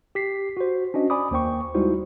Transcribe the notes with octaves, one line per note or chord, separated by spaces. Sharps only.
G4 B6 C7
F#4 C5
C#4 D4 F#4 D#5
D5 G#5 B5 D6 D#6
D#2 A#3 C5 G5 C#6
G3 G#3 D#4 E4 F#4 C5